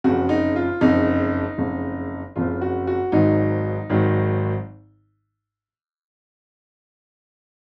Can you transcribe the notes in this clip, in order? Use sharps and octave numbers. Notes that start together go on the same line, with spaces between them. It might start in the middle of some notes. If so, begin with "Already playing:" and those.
F#1 F2 C#3 F#4
D#4
F4
F#1 F2 C#3 D#4
F#1 F2 C#3
F#1 F2 C#3 F4
F#4
F#4
G#1 G#2 D#3 F#3 D#4
G#1 G#2 D#3 F#3